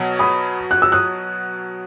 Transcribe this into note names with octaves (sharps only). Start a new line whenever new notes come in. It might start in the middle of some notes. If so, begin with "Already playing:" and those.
Already playing: B2 F#3
B5 D#6
F#6
E6
D#6 F#6